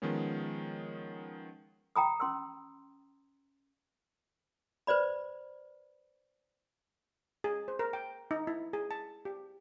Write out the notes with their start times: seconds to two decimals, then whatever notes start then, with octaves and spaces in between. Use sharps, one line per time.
0.02 D#3 F3 G#3 B3 C#4
1.96 G5 A#5 B5 D#6
2.20 C#4 C6 E6
4.87 B4 C5 D5 B5
7.44 G#4
7.68 C5
7.79 A#4
7.93 G5
8.31 D#4
8.47 E4
8.73 G#4
8.91 A5
9.25 G4